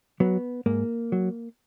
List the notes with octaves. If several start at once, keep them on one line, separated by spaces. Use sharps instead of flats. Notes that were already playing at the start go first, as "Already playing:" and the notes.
F#3 B3
G#2 A#3
F#3